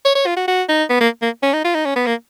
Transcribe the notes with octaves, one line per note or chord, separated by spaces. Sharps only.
C#5
C#5
F4
F#4
F#4
D#4
B3
A#3
A#3
C#4
D#4
F4
D#4
C#4
B3
A#3